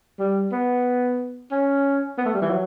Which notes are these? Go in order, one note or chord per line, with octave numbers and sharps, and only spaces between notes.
G3
B3
C#4
B3
A3
G3
E3
F#3